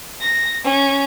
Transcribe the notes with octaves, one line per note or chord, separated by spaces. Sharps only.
A#6
C#4